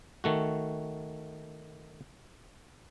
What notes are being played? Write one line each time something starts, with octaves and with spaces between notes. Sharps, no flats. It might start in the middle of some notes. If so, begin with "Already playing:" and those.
D#3 A3 F#4